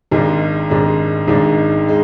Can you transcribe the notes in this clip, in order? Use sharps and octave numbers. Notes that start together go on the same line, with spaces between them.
G#1 G#2 G#3 D4
G#1 G#2 G#3 D4
G#1 G#2 G#3 D4
G#3